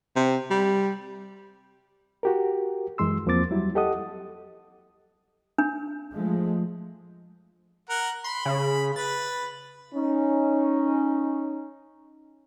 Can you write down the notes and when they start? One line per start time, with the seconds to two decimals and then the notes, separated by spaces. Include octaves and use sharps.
0.16 C3
0.50 G3
2.23 F#4 G4 A#4
2.98 F#2 E3 G#3 C6 E6
3.26 E2 F3 A#3 C4 D6 A6
3.51 F#3 G3 E4
3.75 G4 A4 D#5 F#5 D#6
5.58 D4
6.13 F3 G#3 A3
7.89 A#4 F#5
8.24 B5 C6
8.46 C#3
8.96 B4 A6
9.95 C#4 D#4